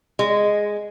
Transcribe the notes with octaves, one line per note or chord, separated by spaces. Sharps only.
G#3